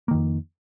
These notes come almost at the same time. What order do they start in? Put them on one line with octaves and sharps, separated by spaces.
A#3 D#3 F2